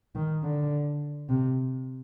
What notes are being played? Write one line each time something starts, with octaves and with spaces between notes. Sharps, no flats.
D#3
D3
C3